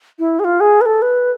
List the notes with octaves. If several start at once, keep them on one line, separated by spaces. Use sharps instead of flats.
E4
G#4
F4
G#4
B4
A4
B4